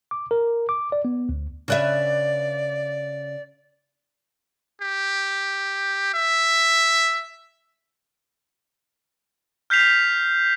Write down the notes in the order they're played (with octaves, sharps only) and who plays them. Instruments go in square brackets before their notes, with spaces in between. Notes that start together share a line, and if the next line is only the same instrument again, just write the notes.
[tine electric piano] D6
A#4
D6
D5
B3
D2
[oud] C#3 B4 E5 [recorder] D5
[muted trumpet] G4
E5
[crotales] F6 G6 B6 C7 F7